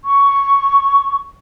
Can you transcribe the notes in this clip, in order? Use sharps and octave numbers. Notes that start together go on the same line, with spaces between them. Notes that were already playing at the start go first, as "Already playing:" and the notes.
C#6